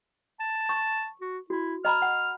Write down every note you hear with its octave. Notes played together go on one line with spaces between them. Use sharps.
A5
C#6
F#4
E4 F#4
D#5 A#5 B5 F6
F#5